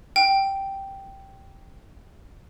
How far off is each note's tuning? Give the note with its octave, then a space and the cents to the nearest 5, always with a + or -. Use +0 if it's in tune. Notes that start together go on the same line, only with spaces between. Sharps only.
G5 -5